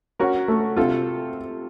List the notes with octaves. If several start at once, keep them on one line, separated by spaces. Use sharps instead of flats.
C#4 F#4 A#4
A3
C3 F4 A4